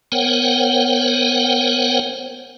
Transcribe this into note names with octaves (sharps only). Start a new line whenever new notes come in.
B3 A#4 C5 C#5 F#5 G5